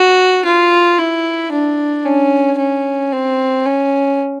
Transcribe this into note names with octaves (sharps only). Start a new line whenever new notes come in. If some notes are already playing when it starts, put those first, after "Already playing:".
Already playing: F#4
F4
E4
D4
C#4
C#4
C4
C#4